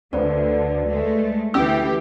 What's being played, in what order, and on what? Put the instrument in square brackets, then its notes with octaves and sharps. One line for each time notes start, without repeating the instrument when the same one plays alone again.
[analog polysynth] D2 [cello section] D3 [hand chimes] B4 C5 D5
[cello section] G#3 A3
[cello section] D2 E3 [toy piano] C#4 E6 [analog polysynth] G4